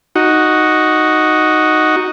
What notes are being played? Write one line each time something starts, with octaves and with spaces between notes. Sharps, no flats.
D#4 F#4